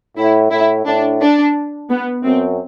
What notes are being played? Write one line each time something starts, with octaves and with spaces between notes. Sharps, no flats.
A2 E4
A2 E4
A2 D4
D4
B3
F#2 C4